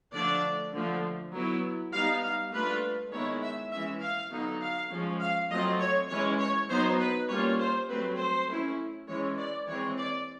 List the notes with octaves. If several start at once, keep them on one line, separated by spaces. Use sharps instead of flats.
D3 F3 A3 D4 D5
D3 F3 A3
F#3 B3 E4
G3 B3 D#4 F5
F5
A3 D4 F4 B4
D#3 G#3 B3 E4 C#5
E5
E3 G#3 C#4 E5
F5
D3 F#3 B3 D#4
F5
F3 G#3 C#4
F5
F#3 A3 C4 F4 D#5
C#5
E3 G#3 C#4 E4 C#5
C#5
F#3 B3 D#4 C5
B4
G3 A#3 C#4 F4 C#5
C5
F#3 A3 C4 B4
C5
A3 C#4 E4
E3 G#3 C#4 C#5
D5
E3 G#3 C4 C#5
D5